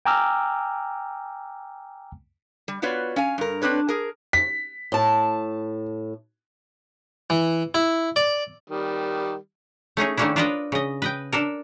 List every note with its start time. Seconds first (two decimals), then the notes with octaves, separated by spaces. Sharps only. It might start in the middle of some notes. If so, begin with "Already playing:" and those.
0.05 G5 G#5 A#5 D6 E6 F6
2.68 G3
2.82 B3 F4 F#4 B4 C#5 D5
3.16 C#4 F5 G#5
3.38 G2 A#4
3.62 C4 D4 B4 C#5
3.89 G#4 A#4
4.33 B6
4.92 A2 A5
7.30 E3
7.74 E4
8.16 D5
8.69 D#3 G3
9.97 A3 C#4 D#4 G#4
10.17 D#3 A3 A#3 C#4 D4 E4
10.36 D4 F4 A#4 B4 D5 D#5
10.72 C#3 D#5
11.02 B4 D#5 G5
11.32 D4 A4 A#4